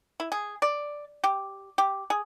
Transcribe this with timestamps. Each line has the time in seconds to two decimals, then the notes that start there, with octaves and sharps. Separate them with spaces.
0.20 E4
0.32 G#4
0.62 D5
1.24 G4
1.78 G4
2.10 G#4